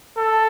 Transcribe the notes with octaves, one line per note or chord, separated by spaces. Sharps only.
A4